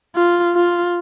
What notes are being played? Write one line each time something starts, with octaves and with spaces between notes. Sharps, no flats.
F4
F4